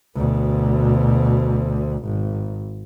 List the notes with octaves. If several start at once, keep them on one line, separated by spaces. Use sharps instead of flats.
D2 B2
G#1